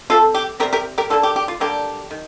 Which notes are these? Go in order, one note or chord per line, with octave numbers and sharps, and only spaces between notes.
C3 G3 C4 F4 A4
G4
C3 G3 C4 G4 A#4
G4 A#4
G4 A#4
D3 G3 A#3 D4 F4 A4
G4
G4
F4
D3 G3 A#3 D4 G4
D#3